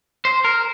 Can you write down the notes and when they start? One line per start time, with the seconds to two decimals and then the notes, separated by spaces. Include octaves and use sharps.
0.25 C5
0.45 A#4